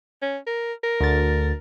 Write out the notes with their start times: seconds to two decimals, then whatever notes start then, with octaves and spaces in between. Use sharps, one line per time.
0.22 C#4
0.46 A#4
0.83 A#4
1.01 D2 A6